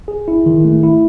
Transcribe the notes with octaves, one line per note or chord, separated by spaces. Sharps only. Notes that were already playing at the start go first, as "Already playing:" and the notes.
G#4
E4
D#3
A3
E4